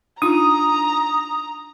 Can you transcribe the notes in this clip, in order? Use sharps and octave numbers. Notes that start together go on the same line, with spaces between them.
D4 D#4 F4 A#5 D#6